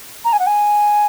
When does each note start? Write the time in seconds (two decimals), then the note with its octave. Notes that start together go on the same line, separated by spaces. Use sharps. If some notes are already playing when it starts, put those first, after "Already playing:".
0.25 A#5
0.33 G#5
0.39 F#5
0.47 G#5